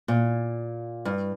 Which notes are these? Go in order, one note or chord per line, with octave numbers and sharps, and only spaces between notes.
A#2
G2